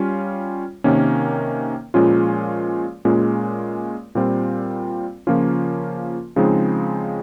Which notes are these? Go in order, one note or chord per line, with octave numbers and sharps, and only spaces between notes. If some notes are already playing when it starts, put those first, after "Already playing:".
Already playing: G3 C#4 F4
C3 D#3 A#3 C#4
A#2 F3 G#3 C#4 F4
A#2 G#3 C#4 F4
A#2 G3 C4 F4
C#3 F3 A#3 C#4 F4
C#3 F3 G#3 C4 D#4